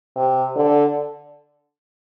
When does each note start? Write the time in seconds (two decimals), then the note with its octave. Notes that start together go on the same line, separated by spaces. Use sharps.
0.16 C3
0.56 D3